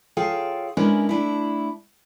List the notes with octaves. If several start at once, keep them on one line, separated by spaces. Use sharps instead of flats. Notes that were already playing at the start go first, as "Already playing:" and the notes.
F4 G#4 A4 C#5 F5 G5
G#3 C#4 D4 E4 A#4 B4
A3 D4 E4